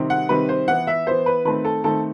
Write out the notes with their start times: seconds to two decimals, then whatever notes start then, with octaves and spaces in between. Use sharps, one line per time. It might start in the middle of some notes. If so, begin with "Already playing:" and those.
Already playing: C3 D#3 G3 C4
0.10 F#5
0.29 C3 D#3 G3 C4 B4
0.49 C5
0.68 E3 B3 F#5
0.87 E5
1.07 E3 B3 C5
1.26 B4
1.45 D#3 A3 C4 B4
1.65 A4
1.84 D#3 A3 C4 A4